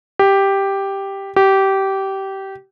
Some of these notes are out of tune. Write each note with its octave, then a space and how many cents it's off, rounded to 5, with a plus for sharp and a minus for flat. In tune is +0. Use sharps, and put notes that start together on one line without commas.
G4 +0
G4 -20